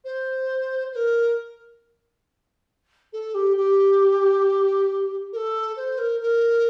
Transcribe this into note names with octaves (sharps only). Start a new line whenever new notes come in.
C5
C5
A#4
A4
G4
G4
A#4
A4
C5
A#4
A#4